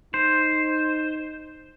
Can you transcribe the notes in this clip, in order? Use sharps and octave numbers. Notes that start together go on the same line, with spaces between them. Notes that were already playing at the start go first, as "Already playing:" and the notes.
D#4 C5